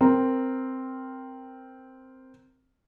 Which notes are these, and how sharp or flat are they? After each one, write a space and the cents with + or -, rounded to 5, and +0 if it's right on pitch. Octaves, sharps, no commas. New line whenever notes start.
C4 +0 A#4 +0